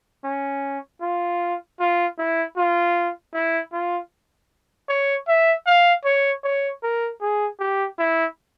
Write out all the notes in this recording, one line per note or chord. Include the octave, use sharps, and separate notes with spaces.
C#4
F4
F4
E4
F4
E4
F4
C#5
E5
F5
C#5
C#5
A#4
G#4
G4
E4